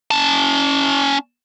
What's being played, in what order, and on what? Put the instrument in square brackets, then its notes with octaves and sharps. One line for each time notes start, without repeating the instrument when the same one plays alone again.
[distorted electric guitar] C#4 A5